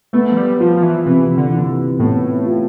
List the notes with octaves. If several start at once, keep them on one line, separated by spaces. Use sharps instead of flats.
A3 B3
F3
G3
F3 F4
F3
E3
C3 E3
D3
E3
A2 B3
F4